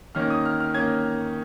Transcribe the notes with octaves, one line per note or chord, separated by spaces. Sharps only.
D#3 A#3 C#4 F6
D#6
F6
F6
A#3 C#4 G#6